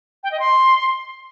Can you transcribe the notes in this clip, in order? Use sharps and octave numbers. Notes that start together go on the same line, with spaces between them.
G5
D#5
C6